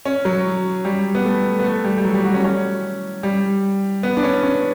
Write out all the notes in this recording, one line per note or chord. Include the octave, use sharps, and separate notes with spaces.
C#4
F#3
G3
B3
A3
B3
A3
G3
G3
F#3
G3
F#4
C#4
C#4
G3
B3
D4
C#4
C#4